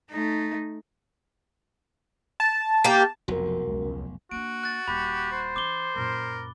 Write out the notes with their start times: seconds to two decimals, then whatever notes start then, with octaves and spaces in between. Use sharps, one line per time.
0.10 A3 D#4
2.40 A5
2.84 A#3 G4
3.28 F1 B1 F2 F#4 A#4
3.67 C#2
4.31 A#3 D4 F#4 D7
4.63 F#6 A6
4.88 D#1 G4 B5
5.32 C5
5.56 E3 C#4 D6 G7
5.96 F#2 A#2 A#4